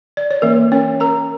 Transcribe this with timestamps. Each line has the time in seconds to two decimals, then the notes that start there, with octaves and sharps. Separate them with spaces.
0.17 D5
0.31 C#5
0.42 E3 A#3 C#4 A#4
0.72 C#4 C#5
1.00 A#4 A#5